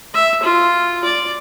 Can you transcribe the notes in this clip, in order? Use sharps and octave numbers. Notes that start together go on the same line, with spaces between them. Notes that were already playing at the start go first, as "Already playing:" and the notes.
E5
F4
D5